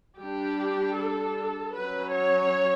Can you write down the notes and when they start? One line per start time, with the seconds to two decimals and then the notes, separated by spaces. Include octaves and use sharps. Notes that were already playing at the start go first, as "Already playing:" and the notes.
0.19 G3 D4 G4
0.96 A4
1.74 F#3 C#4 B4
2.12 C#5